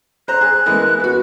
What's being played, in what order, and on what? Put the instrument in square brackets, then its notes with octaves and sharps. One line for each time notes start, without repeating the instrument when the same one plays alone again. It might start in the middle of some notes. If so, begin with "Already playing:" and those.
[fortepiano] C5 A#5 [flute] F#6
[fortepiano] G#4
E3 G#3 A#3
B3 F#4